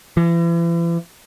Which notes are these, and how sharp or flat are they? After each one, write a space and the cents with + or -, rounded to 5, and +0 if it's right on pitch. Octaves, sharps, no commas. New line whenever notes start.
E3 +40